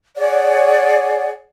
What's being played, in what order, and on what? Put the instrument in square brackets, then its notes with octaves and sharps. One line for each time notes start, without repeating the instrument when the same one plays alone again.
[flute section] G#4 C#5 D5 F#5